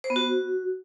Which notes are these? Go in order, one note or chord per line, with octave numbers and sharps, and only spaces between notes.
C5
B3
F#4